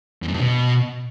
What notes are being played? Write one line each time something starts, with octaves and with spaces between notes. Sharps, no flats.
E2
F#2
G2
B2